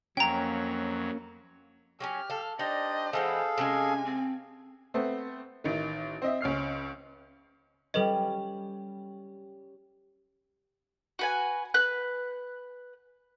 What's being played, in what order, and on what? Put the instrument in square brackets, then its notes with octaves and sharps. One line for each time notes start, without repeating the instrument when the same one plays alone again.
[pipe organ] F2 F#3 [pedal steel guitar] A#3 C#4 [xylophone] G5 A#5
[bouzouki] F#3 C4 C#4 [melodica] G4 [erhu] F6
[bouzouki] A4 F5
[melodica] D4 G4 C5 [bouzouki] D#4 [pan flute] D5 [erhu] D#5
[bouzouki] E3 G#3 B3 [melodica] G#4 A4 F5 [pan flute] C5
[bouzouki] C3 D#3 G#3 [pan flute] C#4 [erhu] G#5
[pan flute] C4
[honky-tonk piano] A3 B3 C4
A1 D#3
C4 D#5 E5
C#2 C#4 F6 C7
[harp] G3 C#4 [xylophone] A4 B4 D#5
[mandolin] F#4 B4 G#5
B4 F#6